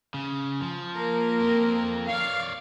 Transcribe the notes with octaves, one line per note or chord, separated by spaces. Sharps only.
C#3
F3
A#3 A#4
F2 C4
C#5 D5 F5